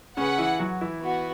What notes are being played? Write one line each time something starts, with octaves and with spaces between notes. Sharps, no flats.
C#3 C#4 G#4 B4 F#5
E3 E4
F#3 F#4
E3 E4
B3 F#4